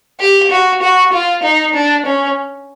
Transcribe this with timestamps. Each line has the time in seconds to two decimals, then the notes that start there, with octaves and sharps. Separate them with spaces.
0.20 G4
0.52 F#4
0.82 F#4
1.13 F4
1.43 D#4
1.74 D4
2.06 C#4